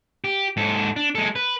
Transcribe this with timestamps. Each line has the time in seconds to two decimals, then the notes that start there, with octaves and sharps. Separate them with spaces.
0.24 G4
0.57 G#2 A4
0.96 D4
1.15 G#3 A4
1.35 B4